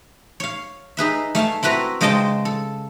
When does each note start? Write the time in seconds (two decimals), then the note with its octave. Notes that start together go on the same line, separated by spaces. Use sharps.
0.40 C#5 F5
0.97 D#4 G#4 B4 E5
1.35 A3 F5 G#5 A5
1.63 C4 E4 F#4 B4 A#5
2.01 C#3 G#3 C5 D#5 G5 A5
2.45 A4